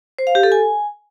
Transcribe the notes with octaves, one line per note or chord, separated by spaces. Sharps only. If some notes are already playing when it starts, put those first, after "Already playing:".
C5
F5
G4
A4
G#5